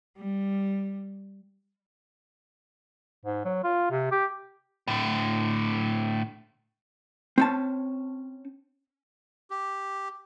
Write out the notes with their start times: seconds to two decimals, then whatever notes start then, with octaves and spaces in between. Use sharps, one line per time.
0.18 G3
3.25 G#2
3.45 F#3
3.64 F4
3.91 C3
4.11 G4
4.88 A2 D3
7.38 C4 C#4 A5
9.50 G4